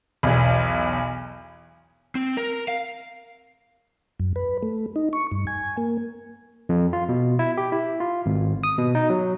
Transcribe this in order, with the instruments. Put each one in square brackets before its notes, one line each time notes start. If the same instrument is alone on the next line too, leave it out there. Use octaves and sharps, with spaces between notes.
[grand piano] B1 E2
[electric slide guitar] C4
A#4
F5
[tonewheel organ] F#2
B4
A3
D#4
C#6
G2
G#5
A#3
[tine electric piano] F2
F4
B2
E4
G4
E4
F4
G#1
D#6
B2
D#4
F#3